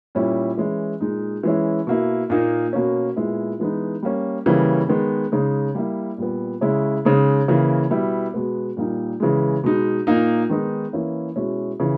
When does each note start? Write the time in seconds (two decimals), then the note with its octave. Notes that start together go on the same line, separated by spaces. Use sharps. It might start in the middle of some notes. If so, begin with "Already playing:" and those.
0.15 A#2 G3 C#4 E4
0.57 E3 G#3 C#4 E4
1.00 A#2 G#3 D#4
1.43 E3 G#3 C#4 E4
1.87 B2 A#3 E4
2.30 A#2 A#3 D#4
2.73 B2 A#3 C#4
3.17 A#2 G#3 B3 E4
3.60 E3 G#3 B3 D#4
4.03 G3 A#3 C#4
4.46 C#3 E3 G3 A#3 C#4
4.89 D#3 G#3 B3
5.32 C#3 G#3 D#4
5.75 G3 A#3 E4
6.18 A#2 G3 B3
6.61 C#3 G#3 C#4 E4
7.05 C#3 G#3 D#4
7.48 C#3 E3 A#3
7.91 B2 G3 B3 E4
8.34 B2 G#3 B3
8.77 A#2 G3 A#3 D#4
9.20 C#3 E3 G#3
9.64 B2 G#3 D#4
10.07 A#2 A#3 D#4
10.50 D#3 G#3 B3 D#4
10.93 E3 A#3 C#4 E4
11.36 B2 G#3 C#4 E4
11.80 C#3 E3